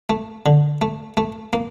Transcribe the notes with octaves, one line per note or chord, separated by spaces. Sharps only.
A3
D3
A3
A3
A#3